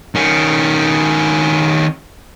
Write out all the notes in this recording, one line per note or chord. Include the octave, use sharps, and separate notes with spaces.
D#3 C#4